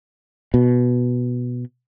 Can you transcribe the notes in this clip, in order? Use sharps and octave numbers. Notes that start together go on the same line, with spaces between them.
B2